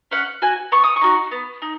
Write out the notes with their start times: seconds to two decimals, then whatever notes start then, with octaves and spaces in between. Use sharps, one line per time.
0.11 C#4 F#5
0.42 F#4 G#5
0.72 B3 C#6
0.84 D#6
0.96 C#6
1.01 D#4 F#4
1.31 B3
1.62 D#4